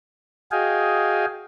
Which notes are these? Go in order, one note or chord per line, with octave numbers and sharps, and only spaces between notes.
F#4 G#4 D#5 F5 G5 G#5